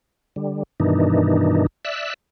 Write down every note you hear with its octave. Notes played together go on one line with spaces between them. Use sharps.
D3 G3
G2 B2 D#3 E3 D4 D#4
D5 E5 E6 F#6